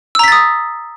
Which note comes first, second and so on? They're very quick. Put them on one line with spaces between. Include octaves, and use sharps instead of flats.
E6 A#5 B6 A6 D#6